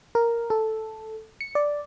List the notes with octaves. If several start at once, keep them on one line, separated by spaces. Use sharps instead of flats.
A#4
A4
C#7
D5